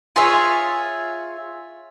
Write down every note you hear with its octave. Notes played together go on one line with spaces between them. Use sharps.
F4 G#4 C#5 E5